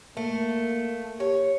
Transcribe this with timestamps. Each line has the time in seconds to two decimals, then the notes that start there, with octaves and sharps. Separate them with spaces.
0.17 A3 A#3
1.20 G4 C#5